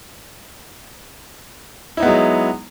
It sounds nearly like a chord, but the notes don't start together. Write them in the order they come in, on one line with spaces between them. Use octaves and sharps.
E4 D#4 B3 G#3 F#3